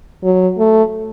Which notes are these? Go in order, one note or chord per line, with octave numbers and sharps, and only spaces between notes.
F#3
A3